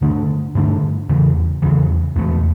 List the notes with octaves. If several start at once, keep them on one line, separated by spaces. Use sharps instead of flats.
G2 D3 A3 D4
G2 D3 A3 D4
E2 C#3 E3
E2 C#3 E3
E2 B2 A3